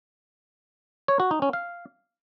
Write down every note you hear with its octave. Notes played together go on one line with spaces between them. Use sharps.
C#5
F#4
D#4
C#4
F5